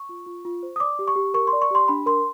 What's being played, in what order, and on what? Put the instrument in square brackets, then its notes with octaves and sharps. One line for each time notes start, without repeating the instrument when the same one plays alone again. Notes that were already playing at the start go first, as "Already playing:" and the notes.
Already playing: [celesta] C#6
F4
F4
F4
C5
D#6
D5 D6
G4
C#6
G4
A#4 C#6
C6
D5
C#6
G4 C6
D4 B5
A#4 C6